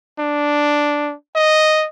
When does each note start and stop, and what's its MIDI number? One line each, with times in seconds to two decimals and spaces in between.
0.19 1.13 62
1.35 1.86 75